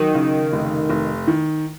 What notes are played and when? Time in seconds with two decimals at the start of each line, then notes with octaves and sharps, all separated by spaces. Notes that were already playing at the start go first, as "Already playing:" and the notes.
Already playing: D#3 F#3
0.15 C#3
0.52 F1
0.90 F1
1.27 D#3